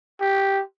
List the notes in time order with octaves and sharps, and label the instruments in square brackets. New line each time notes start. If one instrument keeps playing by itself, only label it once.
[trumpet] G4